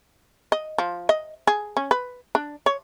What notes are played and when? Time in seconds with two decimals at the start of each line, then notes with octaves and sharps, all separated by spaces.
0.52 D#5
0.78 F3
1.09 D#5
1.47 G#4
1.77 C#4
1.91 B4
2.35 D4
2.66 C#5